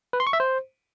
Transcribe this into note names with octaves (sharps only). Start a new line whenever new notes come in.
B4
C6
C#6
E5
C5